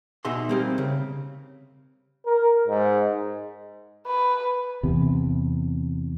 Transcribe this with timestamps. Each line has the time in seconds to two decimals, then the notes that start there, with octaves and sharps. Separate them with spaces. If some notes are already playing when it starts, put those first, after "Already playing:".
0.25 B2 D#4 G#4 E5 C6
0.49 G3 A#3 C4
0.78 C#3
2.26 A#4
2.68 G#2
4.07 B4
4.83 E2 C3